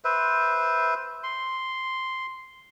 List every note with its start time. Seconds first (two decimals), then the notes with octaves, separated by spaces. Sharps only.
0.05 B4 C5 E5
1.24 C6